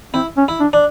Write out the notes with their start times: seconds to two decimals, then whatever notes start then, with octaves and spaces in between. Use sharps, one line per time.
0.14 C4 E4
0.37 C#4
0.48 E4
0.60 D4
0.73 D4